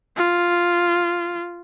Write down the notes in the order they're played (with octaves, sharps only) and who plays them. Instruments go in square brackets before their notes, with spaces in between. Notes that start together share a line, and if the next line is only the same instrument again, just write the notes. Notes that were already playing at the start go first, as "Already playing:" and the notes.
[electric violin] F4